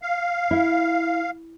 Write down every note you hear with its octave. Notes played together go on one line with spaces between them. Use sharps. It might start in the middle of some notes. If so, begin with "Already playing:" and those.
F5
E4